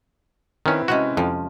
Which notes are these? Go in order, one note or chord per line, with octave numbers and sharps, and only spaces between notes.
D#3 C4 C#4 E4 B4
C3 G#3 C#4 F#4
F2 F3